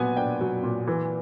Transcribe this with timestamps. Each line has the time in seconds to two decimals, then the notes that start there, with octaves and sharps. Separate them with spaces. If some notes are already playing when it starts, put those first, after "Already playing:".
Already playing: A#2 F#3 B3 G#5
0.17 D4 G5
0.41 F#3
0.63 A#2
0.87 E3